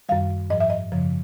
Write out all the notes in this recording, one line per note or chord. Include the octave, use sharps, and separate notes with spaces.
F#2 D#3 G3 F5
G#2 F3 D#5
E5
D#5
F#2 C#3 F3